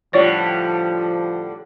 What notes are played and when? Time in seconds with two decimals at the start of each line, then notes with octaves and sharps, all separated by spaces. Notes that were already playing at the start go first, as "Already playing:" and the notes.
0.13 A2 D3 F3 G3 F4 C#5 D5